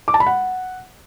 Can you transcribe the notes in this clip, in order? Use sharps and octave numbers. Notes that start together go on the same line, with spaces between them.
D6
A5
B5
F#5